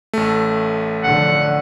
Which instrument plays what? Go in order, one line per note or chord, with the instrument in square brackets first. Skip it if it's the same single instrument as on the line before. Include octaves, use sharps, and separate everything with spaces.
[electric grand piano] A1 A3
[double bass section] D3 F3 [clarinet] F#5